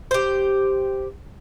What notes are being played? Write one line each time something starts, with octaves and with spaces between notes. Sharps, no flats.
G4 C5